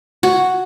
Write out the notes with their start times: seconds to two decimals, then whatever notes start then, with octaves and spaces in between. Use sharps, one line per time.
0.23 F#4